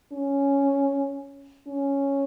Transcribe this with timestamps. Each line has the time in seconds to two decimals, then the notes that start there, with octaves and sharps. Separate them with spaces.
0.12 C#4
1.68 C#4